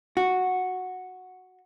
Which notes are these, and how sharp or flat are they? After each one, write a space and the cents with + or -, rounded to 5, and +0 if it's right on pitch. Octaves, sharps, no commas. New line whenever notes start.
F#4 -5